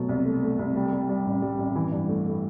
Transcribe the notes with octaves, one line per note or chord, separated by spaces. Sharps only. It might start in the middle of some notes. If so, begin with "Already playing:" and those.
Already playing: B2 F#3 A3
C2
A3
A3
C2
G3
G3
G3
A1
G3
A1
E3
G2
A3
A3